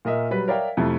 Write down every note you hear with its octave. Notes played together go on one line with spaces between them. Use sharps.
A#2 A#4 D#5 E5
F#3 G3 B4 B6
A#4 C#5 D5 E5 F5 G5
F2 C3 A3 E4 F4